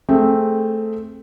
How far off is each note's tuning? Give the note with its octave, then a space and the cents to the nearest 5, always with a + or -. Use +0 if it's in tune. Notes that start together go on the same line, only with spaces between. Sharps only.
A3 +0 C4 +0 G#4 +10